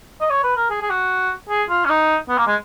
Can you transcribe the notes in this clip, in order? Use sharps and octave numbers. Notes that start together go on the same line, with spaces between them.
D#5
C#5
B4
A#4
G#4
G#4
F#4
G#4
F4
C#4
D#4
B3
A#3
G#3